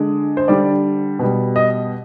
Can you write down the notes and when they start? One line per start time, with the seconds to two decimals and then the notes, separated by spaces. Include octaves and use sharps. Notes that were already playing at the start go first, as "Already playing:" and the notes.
Already playing: D3 G#3
0.37 C5
0.48 D3 G3 D5
1.19 B2 G3
1.56 D#5